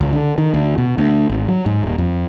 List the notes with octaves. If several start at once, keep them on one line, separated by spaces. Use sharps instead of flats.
C#2
D3
D#3
D2
B2
D2
G#1
F#3
G#2
D#1
F2